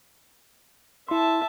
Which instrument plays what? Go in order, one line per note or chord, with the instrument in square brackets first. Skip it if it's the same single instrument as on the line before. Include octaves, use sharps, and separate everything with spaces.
[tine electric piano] E4 C6 [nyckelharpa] E5 A5